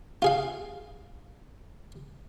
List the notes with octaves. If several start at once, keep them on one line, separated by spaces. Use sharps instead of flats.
F4 G#4 F5